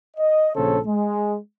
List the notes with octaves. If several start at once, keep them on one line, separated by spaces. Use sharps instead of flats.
D#5
A#1 C#3 A4 C5 C#5
G#3